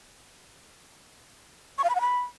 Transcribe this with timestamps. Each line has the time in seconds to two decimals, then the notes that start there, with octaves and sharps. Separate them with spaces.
1.78 C#6
1.84 F5
1.90 B5
1.95 F#5
2.01 B5